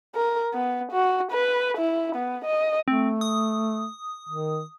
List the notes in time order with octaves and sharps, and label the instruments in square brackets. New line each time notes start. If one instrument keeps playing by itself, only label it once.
[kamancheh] A#4
B3
F#4
B4
E4
B3
D#5
[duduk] A3 [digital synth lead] C4
[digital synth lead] D#6
[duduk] D#3